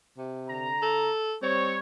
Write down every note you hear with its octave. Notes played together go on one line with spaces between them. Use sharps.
C3
D3 A#5
A4
G3 C4 C#5